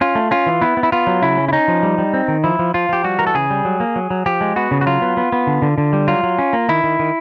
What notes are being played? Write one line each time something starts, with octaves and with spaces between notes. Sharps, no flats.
C#4 F4
A3
C#4 F4
E3
B3 E4
B3
E4
B3 F4
F#3
C#3 E4
C#4
E4
C#4 D#4
F3
G3
G3
C4
D#3
F3 E4
F3
F3 F4
F3 G4
G3 F#4
E3 A#4
A4
C#3 G#4
G3
F#3
A#3
F#3
F#3
F3 G4
G#3
B3 F#4
C#3
F#4
F#3 F4
B3
B3
B3
D3
D3
D3
G3
F#3 F4
F#3
C#4
A#3
D#3 E4
D#3
D#3